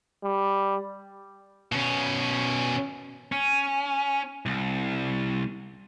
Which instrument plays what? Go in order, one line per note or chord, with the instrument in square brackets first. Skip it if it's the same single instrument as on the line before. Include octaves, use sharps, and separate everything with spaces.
[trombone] G3
[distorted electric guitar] B2 C#4
[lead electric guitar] C#4
C2